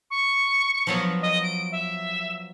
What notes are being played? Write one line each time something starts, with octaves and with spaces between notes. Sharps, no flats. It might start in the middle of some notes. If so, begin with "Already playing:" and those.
C#6
F3 F#3 B3
D#5
D7
E5